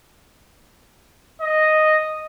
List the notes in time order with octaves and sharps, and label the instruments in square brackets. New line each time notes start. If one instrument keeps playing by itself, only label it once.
[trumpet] D#5